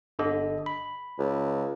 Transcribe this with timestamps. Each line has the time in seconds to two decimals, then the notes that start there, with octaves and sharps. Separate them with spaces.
0.19 G1 D3 D#5
0.66 B5
1.19 C#2